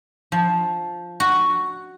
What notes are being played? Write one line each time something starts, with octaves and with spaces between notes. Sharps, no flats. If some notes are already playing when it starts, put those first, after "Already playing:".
F3
F#4